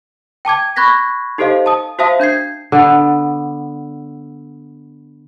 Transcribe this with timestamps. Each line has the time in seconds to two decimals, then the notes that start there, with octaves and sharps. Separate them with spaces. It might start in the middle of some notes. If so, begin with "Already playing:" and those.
0.45 G5 A5 D6 G#6
0.76 B5 C#6 F#6 G#6 A#6 B6
1.38 D#4 G4 A4 C5 D#5 F5
1.66 A5 D#6
1.99 F#4 C5 E5 F5 A5 D#6
2.20 D4 G6 G#6 C7
2.72 D3 B3